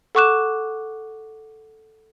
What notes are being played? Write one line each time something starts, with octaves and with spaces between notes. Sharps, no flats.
A4 F#5 C#6 D6 F#6 E7